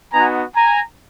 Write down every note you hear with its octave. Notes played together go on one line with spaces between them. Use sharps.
B3 D#4 F#4 G#5 A#5
G#5 A#5